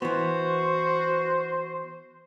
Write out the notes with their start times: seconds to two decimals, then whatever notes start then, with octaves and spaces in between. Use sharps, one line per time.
0.02 E3 B3 F#4 C5